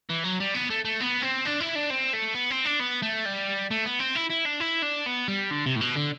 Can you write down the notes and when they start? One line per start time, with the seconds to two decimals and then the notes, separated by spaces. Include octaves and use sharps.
0.10 E3
0.24 F#3
0.40 G3
0.55 B3
0.70 A3
0.85 A3
1.00 B3
1.22 C4
1.45 D4
1.60 E4
1.75 D4
1.90 C4
2.13 A3
2.35 B3
2.50 C4
2.65 D4
2.80 B3
3.02 A3
3.25 G3
3.71 A3
3.85 B3
4.00 C4
4.16 E4
4.30 E4
4.46 D4
4.61 E4
4.83 D4
5.06 B3
5.28 G3
5.51 D3
5.66 C3
5.76 A2
5.81 B2
5.96 D3